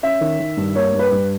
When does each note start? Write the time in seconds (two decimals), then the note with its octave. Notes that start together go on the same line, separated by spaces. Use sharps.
0.03 C#4 E5
0.21 D#3
0.40 D#3
0.57 G2
0.75 A#3 C#5
0.93 G2
0.99 B4
1.11 G2